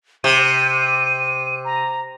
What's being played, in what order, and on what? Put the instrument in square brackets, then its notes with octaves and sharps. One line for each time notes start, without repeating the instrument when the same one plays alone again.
[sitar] C3 [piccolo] D#7
[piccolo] A#5